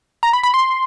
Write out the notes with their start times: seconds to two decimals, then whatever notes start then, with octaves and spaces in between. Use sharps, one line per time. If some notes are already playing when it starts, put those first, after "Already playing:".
0.23 A#5
0.33 B5
0.43 B5
0.54 C6